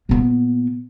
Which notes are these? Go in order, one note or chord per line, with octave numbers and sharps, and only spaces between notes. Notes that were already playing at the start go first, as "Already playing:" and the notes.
A#2 B3